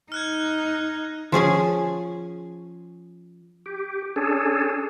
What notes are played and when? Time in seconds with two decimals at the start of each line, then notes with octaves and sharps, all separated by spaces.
0.12 D#4 F6 F#6 G#6
1.32 F3 C#4 G#4 G#5
3.66 G4
4.16 C#4 D4 G#4 A4